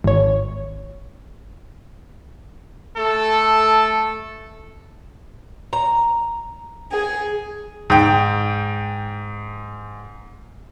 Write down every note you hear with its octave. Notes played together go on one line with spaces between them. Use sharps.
G#1 C#5
A3 A4
A#5
G#4
G#2 G5